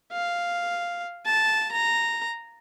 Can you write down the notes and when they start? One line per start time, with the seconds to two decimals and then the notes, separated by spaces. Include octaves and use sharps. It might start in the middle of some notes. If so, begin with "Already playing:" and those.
0.12 F5
1.25 A5
1.72 A#5